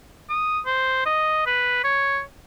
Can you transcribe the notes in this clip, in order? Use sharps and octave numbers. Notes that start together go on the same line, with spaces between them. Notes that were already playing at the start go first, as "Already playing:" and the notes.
D#6
C5
D#5
B4
C#5